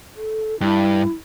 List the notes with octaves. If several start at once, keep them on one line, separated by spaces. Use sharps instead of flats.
A4
G2 E4